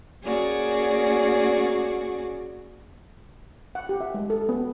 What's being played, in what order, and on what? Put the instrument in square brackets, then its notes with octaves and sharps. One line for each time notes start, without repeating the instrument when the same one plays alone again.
[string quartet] A#3 C#4 F#4 G#4 D5
[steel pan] F#5
G4
E5
G#3
A4
B3